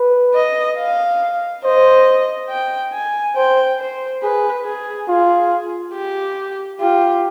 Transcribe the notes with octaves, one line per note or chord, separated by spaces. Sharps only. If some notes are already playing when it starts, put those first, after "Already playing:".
Already playing: B4
D#5
F5
C5 D#5
G5
G#5
C5 G5
C5
G#4 B4
G#4
F4 G#4
G4
F4 G4